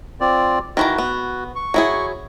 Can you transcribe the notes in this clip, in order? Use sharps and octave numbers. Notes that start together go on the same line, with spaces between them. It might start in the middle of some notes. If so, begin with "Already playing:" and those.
C4 F4 D5
D#3 E3 F#4 A#5
B3
C#6
F#3 E4 G#4